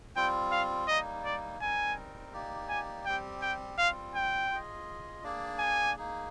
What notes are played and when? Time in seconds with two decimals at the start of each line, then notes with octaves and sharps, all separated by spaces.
0.16 G3 C4 F4 G5
0.51 F5
0.88 G3 A#3 D#4 D#5
1.25 D5
1.60 G3 C4 D#4 A#4 G#5
2.33 A#3 D#4 G4 D5
2.69 G#5
3.06 G3 C4 G4 G5
3.42 G5
3.78 G3 C4 F4 F5
4.15 G5
4.50 F4 G#4 D#5
5.23 A#3 D4 G#4 D5
5.59 G#5
5.96 A#3 D#4 G#4